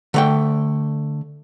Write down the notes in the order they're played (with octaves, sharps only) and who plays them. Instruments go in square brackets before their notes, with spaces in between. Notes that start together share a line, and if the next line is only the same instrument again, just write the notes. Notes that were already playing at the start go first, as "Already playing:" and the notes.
[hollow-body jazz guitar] D3 A3 G5